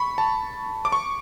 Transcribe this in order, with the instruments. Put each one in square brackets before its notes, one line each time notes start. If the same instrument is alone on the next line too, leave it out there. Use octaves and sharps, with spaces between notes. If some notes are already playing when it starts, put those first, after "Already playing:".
Already playing: [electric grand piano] B5 C#6
A5
D6
C#6